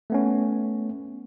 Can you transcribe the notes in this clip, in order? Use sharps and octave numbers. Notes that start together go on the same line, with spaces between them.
A3 B3 C#4